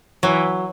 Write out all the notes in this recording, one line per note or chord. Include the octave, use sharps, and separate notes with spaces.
E3 F#3